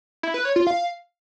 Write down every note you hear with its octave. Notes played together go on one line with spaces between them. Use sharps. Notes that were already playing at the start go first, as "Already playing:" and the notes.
E4
B4
C#5
F4
F5